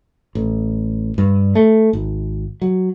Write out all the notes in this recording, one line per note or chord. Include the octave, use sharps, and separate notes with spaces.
A1
G2
A3
G#1
F#3